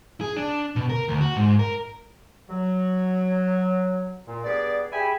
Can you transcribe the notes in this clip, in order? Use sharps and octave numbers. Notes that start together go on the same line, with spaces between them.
G#4
D4
B2
A#4
D2
F#4
G#2
A#4
F#3
A#2
G2 B3 G#4 D5
G4 G#4 E5 G5 G#5 B5